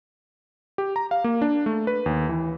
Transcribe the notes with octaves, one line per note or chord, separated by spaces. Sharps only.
G4
A#5
F5
A#3
D4
A3
B4
D#2
E3